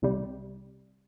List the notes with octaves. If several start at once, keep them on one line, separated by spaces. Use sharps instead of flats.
C2 C3 G3